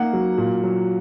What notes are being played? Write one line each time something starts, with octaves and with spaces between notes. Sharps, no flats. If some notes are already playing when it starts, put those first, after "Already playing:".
Already playing: A#3 D#4 F#5
F#3
A#2
F#3